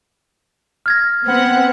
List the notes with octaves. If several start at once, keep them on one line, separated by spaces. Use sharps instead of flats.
F6 G#6 A#6
B3 C4 F#5